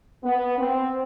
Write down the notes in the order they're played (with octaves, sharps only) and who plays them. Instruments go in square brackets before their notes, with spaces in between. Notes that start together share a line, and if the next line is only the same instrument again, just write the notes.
[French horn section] B3
C4